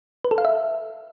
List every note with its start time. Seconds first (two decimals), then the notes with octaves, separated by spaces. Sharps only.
0.25 B4
0.31 A4
0.38 F5
0.45 E5